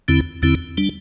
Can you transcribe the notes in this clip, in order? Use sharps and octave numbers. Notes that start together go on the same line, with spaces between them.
E2 D3 C4 E4
E2 D3 C4 E4
G3 D4